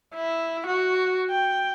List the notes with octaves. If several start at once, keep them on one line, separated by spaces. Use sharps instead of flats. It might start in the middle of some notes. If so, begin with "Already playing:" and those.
E4
F#4
G5